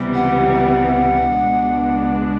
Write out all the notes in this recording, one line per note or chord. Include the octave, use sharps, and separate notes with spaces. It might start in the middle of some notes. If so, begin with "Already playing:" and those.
Already playing: C#2 C3 E3 G3 B3
F#5
C#2 B2 G#3 B3 D4